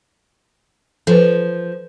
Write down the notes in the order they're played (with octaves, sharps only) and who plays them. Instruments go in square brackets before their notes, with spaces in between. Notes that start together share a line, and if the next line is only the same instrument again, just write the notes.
[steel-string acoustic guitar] F3 [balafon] A4 B4